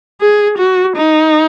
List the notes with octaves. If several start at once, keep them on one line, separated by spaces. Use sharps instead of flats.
G#4
F#4
D#4